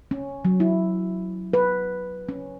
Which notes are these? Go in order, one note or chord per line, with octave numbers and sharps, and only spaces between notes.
C#4
F#3
E4
B4
C#4